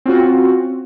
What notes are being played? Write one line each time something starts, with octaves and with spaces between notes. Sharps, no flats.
C4 C#4 F4 F#4